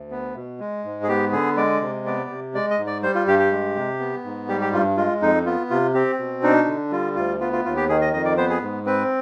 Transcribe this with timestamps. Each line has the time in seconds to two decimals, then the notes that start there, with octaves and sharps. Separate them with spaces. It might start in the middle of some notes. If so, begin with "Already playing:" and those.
Already playing: D2
0.11 B3
0.36 B2
0.60 G#3
0.84 G#2
1.03 G#4
1.08 B3 G4
1.32 D3 G#4
1.57 G#3 D5
1.81 C3
2.06 B3 D5
2.30 C3
2.55 G#3 D5
2.70 D#5
2.79 G#2
2.87 D5
3.03 G3 C5
3.15 F4
3.27 G2 G4
3.39 G4
3.52 G#3
3.76 C3
4.00 B3
4.24 G#2
4.48 G3 G4
4.61 G4
4.73 G2 F4
4.97 G#3 F4
5.22 F2 D#4
5.46 B3 F4
5.70 C3 F4
5.94 C4 G4
6.19 B2
6.43 D4 D#4
6.67 D3
6.91 G3 F4
7.16 D2 F4
7.40 B3 F4
7.53 F4
7.65 D#2 F4
7.76 G4
7.89 D#3 G#4
8.01 D#5
8.13 F2 D#5
8.25 D5
8.37 B3 C5
8.50 G#4
8.62 G#2
8.86 C4 B4